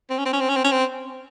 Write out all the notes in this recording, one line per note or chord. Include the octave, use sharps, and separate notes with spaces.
C4
C#4
C4
C#4
C4
C#4
C4
C#4
C4